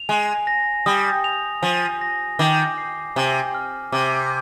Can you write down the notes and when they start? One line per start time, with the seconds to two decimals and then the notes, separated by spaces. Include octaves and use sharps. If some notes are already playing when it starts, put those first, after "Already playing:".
Already playing: F7
0.09 G#3 G#5
0.47 A#6
0.86 G3 D#6
1.24 F7
1.62 F3 G#5
2.01 A#6
2.39 D#3 D6
2.78 C7
3.16 C3 G#5
3.55 F6
3.92 C3 D6